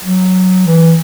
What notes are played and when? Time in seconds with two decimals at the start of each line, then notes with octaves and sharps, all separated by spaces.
0.04 F#3
0.66 E3